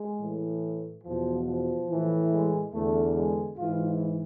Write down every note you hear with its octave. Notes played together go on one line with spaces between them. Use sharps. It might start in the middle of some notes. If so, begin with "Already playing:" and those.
Already playing: G#3
A2 E3
E2 B2 F3
F3
A2 E3
G#3
E2 D3 A3
G#3
G#2 E3 F4